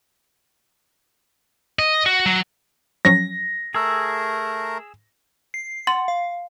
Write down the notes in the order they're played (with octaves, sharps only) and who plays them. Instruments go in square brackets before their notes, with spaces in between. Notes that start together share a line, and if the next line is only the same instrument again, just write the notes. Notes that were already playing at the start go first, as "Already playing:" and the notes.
[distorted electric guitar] D#5
F#4
F#3
[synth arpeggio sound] F3 F#3 C#4 [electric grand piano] A#6
[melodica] A3 A#4 A#5 [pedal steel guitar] G#4 E6
[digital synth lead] C7
[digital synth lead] F#5 [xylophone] C6 A6 F#7
[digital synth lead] F5